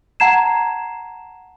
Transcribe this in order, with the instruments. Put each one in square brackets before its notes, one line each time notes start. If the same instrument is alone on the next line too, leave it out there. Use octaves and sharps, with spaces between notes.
[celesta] F#5 A5 A#5 G#6 C7 E7